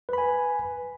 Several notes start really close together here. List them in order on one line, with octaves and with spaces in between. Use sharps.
B4 B5 G#5